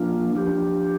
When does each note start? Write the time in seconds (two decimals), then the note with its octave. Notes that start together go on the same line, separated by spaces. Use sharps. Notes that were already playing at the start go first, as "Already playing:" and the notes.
Already playing: F3 A#3 D4 F4
0.36 F3 D4 G4